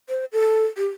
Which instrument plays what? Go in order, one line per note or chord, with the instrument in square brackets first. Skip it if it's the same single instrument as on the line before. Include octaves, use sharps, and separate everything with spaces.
[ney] C5
A4
G4